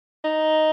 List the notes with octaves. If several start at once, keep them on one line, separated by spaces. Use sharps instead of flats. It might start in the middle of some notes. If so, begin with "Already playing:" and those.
D#4